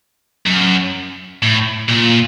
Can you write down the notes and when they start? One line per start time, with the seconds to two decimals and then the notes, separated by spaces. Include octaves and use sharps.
0.46 F#2
1.42 A2
1.89 A#2